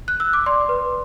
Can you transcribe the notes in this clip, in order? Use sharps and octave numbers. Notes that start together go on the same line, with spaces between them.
F#6
E6
D6
D5 C6
B4